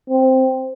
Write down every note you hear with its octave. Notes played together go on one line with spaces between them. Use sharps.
C4